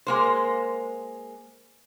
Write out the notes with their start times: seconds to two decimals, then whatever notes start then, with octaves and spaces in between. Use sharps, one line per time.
0.07 G#3 A#3 C5